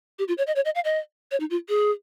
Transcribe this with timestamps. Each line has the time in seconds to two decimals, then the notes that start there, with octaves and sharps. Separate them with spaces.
0.19 G4
0.28 F4
0.38 C#5
0.47 D#5
0.56 C#5
0.65 D#5
0.75 F5
0.85 D#5
1.31 C#5
1.40 D#4
1.50 F4
1.69 G#4